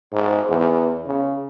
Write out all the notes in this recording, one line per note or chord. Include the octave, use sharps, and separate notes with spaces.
G#2
E2
C#3